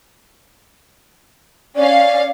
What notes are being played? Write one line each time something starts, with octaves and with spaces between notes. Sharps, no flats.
C#4 D5 F5